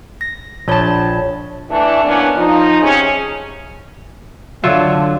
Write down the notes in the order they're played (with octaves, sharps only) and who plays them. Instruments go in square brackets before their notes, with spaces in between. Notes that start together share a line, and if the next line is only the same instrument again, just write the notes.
[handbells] A#6
[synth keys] A#1 A5 [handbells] D4 C#5 B5
[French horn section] E3 A3 D4
E3 A#3 B3 C#4 D4
F3 D#4
C3 C#4 G#4
[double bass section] D3 [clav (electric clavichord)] F#3 F4 E5